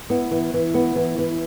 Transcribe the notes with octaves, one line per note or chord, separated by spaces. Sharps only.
B3 E4
E3
E3
B3
E3
E3